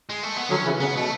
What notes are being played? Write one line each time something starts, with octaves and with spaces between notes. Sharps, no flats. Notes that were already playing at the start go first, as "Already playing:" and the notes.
G#3
A3
B3
D3 F#3 C#4
C#3 E3
C#3 B3
B2 A3